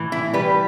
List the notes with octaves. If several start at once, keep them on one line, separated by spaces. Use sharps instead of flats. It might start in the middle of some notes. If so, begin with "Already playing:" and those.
Already playing: A2 E3
E4
G3 B4